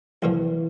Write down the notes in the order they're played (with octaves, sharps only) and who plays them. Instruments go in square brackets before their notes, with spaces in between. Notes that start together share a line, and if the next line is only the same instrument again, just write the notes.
[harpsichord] C2 A#2 F3 [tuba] E3